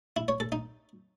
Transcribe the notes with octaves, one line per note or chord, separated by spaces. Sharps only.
E4
C#5
A4
D#4